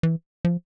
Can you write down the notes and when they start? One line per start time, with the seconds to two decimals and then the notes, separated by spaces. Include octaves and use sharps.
0.03 E3
0.45 F3